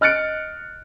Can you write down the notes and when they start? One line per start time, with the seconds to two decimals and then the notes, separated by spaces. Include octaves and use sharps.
0.01 D#5 F6 F#6 A6 C#7 D7